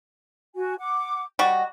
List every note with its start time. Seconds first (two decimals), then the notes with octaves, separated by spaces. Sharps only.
0.55 F#4 G#5
0.79 F#5 D6
1.39 G3 F#4 D#5